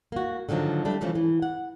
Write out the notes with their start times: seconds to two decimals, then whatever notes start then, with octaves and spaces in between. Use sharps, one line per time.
0.12 A#3 F#4
0.49 D3 D#3 F3 F#3 D4
0.85 G3 A3 D4
1.01 C3 E3 F3 A3 C#4
1.15 E3
1.42 F#5